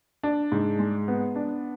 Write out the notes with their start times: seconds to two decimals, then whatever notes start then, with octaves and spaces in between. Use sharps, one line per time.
0.23 D4
0.52 G#2
0.79 G#3
1.08 B3
1.36 D4